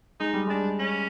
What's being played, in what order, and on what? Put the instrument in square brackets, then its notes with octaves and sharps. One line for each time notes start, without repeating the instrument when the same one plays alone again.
[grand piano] G#3 [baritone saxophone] D#4
[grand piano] G3
[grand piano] G#3 [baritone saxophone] D4
[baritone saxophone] C#4